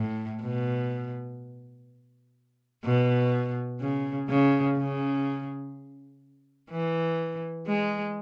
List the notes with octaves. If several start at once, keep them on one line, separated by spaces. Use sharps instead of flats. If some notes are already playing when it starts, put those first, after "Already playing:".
Already playing: A2
B2
B2
C#3
C#3
C#3
E3
G#3